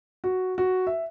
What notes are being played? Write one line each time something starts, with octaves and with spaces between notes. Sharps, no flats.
F#4
F#4
E5